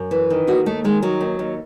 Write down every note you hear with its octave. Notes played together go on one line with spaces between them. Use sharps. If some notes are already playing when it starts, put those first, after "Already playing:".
Already playing: F#2
E3
D#3
D#2 F#4
D#2 A3
D#3 G#3
D#3 F#3
D#2
D#2